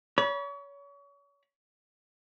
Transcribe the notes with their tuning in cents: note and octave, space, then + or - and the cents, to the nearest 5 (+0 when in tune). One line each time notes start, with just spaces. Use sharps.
C#5 +35 B5 -30